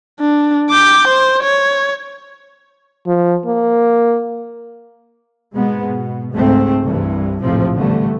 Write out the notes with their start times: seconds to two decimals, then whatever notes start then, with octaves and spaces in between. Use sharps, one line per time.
0.21 D4
0.70 D6 G6
1.08 C5
1.44 C#5
3.07 F3
3.46 A#3
5.55 G#2 B2 G#3 B3
5.85 B2
6.36 C#2 G#2 A3 C4
6.86 C2 G2 E3
7.42 A#1 F2 A2 C3 F3 C4
7.77 D3 E3 G3 A3 B3